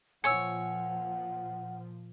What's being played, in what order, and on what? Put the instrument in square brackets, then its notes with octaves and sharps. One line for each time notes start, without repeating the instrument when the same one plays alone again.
[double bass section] A#2 F3 [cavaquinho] C#5 G#5 [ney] F#5 [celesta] E6 C#7